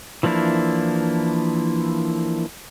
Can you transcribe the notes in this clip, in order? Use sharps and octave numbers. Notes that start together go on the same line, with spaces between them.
E3 F3 A#3 D4 E4